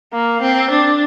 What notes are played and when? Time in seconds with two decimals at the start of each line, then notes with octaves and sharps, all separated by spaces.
0.13 A#3
0.41 C4
0.70 D4